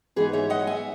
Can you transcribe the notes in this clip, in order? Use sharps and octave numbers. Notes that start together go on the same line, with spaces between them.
G#2 E3 G#3 B3 D#4 G#4 B4
C#5 E5
D#5 F#5
E5 G#5